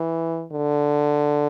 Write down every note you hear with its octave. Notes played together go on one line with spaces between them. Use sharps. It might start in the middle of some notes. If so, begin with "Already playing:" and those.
Already playing: E3
D3